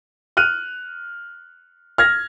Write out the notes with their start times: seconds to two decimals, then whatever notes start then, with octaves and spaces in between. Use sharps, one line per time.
0.37 F6 F#6 D#7
1.98 F6 G#6 A#6